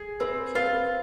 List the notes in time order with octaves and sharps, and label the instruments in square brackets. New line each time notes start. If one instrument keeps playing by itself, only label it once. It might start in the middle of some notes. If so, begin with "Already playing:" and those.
Already playing: [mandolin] G#4
[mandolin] C4 [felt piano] B4
[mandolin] F4 [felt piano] B4